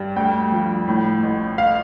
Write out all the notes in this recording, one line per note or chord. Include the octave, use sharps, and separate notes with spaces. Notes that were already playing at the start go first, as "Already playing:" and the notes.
Already playing: G2 G3
D2 G5
F3
A2
A1
F5